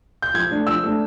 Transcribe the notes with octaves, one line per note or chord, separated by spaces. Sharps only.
G6
F3 G#6
A3 D4
F3 E6
A3 D4